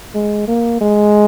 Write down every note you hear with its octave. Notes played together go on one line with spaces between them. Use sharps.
G#3
A#3
G#3